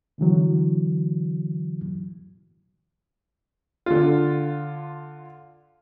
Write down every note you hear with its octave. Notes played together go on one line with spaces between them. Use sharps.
B2 D3 E3 F#3
D3 F4